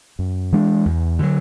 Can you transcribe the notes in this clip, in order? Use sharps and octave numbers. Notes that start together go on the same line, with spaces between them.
F#2
E3 G#3 D4
E2
D3 F#3